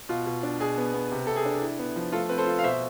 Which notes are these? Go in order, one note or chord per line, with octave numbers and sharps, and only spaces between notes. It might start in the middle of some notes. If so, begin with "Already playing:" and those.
B2 F4
B2
D4
B2 G#4
B3
B3
C3
C3 A4
G#4
D4
E4
B3
F3
A3 F4 A4
C4 B4
A4 C5
F4
F5
B2 C5 E5